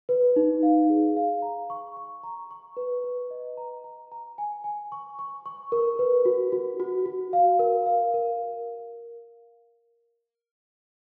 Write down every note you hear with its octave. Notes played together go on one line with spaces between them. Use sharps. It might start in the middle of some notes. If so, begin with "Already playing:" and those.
B4
D#4
F5
G#4
F5
A#5
C#6
C#6
A#5
C#6
B4
B4
D#5
A#5
A#5
A#5
G#5
G#5
C#6
C#6
C#6
A#4
B4
F#4
F#4
F#4
F#4
F5
A#4
F5
A#4